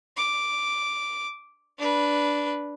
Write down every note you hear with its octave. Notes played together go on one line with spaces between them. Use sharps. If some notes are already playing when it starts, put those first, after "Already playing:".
D6
D4 B4